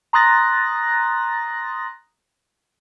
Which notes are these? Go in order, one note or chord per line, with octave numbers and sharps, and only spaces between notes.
A#5 C6 D#6 F#6 A6 A#6